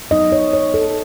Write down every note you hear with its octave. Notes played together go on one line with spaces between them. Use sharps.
F#3 B3 D#4 D#5
C#5
C#5
A4